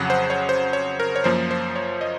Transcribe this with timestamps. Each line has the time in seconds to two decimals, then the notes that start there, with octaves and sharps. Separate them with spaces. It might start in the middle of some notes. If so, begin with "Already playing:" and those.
Already playing: F2 C#3 F#3 F#5
0.10 C5
0.30 C#5
0.49 C5
0.73 C#5
1.00 A#4
1.16 C#5
1.24 F#2 F3 A#3 C5
1.51 C5
1.76 C#5
2.01 D#5